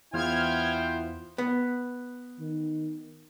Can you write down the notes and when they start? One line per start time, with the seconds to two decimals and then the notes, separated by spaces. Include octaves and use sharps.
0.14 E2 B3 E4 F4 C5 G5 F6 G#6
1.38 B3
2.40 D#3